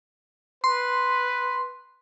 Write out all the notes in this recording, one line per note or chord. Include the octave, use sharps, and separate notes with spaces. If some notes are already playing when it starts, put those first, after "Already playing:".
B4 C6